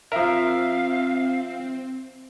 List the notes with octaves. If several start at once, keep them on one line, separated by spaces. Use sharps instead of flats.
F3 C4 A#4 E5 F5